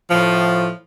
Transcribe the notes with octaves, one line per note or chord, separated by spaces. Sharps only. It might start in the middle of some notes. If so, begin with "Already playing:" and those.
A2 F3